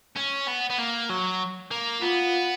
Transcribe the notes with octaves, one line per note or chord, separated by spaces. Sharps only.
C#4
B3
B3
A#3
F#3
A#3
B3 F4